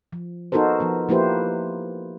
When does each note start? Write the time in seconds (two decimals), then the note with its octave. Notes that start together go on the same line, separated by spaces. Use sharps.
0.13 F3
0.52 B3 D#4 F#4 A4 A#4 C5
0.80 F3 B3
1.09 F3 A#3 E4 G4 B4 C5